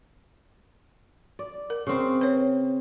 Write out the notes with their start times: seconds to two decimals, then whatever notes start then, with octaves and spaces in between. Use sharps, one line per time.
1.39 D5
1.70 A#4
1.87 C#3 C4
2.21 B4 C#5